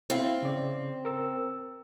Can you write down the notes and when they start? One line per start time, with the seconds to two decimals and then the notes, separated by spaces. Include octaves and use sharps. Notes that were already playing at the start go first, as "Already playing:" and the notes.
0.10 C4 E4 F5
0.43 C#3 D5
1.05 A#4 E6